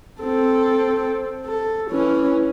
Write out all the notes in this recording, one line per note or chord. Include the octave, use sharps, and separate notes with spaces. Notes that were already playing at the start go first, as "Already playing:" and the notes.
C4 A4
A4
E3 C#4